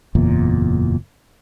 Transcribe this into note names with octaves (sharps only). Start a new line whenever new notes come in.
F#1 E2 A#2